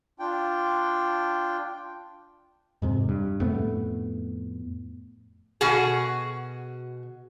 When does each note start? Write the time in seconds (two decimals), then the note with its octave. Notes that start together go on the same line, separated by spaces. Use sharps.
0.19 D4 F4 G5
2.82 F2 G#2 C3
3.09 G2
3.40 F2 A2 A3 B3
5.61 B2 F#4 G#4